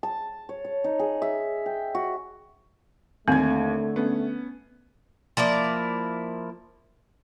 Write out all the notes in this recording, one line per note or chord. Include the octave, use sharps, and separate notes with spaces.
A5
C#5
C#5
D#4
G#4
E5
G5
F#4
D#2 D3 A3 C4 G#6
B3 C#4
F3 A#3 E4 D5